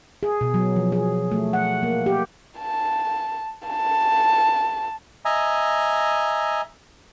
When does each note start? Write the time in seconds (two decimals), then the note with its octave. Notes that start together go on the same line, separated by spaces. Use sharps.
0.23 G#4
0.41 B2
0.54 F#3
0.76 F3
0.92 G#4
1.32 A3
1.53 F#5
1.83 A#3
2.06 G4
2.59 A5
3.68 A5
5.25 D#5 E5 G#5 A#5